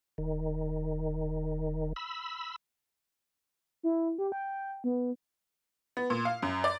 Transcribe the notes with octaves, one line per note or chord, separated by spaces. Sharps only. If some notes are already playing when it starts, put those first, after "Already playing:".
D#1 D#3
B5 E6
E4
G4
G5
B3
B3
A#2
F5
F#2
D5